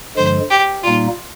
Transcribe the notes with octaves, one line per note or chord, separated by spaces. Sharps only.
G2 D3 F3 G#3 C5
G4
A#2 G3 A#3 D#4 F4